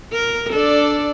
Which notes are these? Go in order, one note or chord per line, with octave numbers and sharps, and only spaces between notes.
A#4
D4 A4 D5